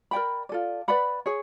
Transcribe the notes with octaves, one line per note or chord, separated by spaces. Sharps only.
A#4 D5 G5 B5
F4 A4 D5
B4 D5 F#5 B5
G#4 C#5